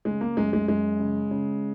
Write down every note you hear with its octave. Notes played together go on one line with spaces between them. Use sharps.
C#3 G#3
A#3
F#2 G#3
G#3
F#2 G#3
C#3
C#3